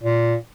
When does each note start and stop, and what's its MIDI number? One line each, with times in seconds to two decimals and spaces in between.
0.03 0.35 46